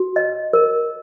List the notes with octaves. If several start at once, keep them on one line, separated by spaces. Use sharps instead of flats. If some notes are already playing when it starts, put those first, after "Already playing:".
Already playing: F#4
D#5
A#4